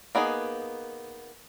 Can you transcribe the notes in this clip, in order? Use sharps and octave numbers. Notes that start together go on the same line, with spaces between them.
A#3 B3 D#4 G#4